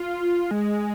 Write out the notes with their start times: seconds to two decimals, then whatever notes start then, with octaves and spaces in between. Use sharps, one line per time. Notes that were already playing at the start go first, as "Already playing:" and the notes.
Already playing: F4
0.51 G#3